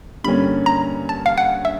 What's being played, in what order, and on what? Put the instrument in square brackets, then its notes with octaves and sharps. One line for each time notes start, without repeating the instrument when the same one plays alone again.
[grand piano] G2 D3 G3 A#3 C#4 [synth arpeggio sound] B5
[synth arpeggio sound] A#5
A5
F5
F#5
E5